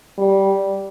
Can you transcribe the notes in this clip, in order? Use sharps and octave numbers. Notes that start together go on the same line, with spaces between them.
G3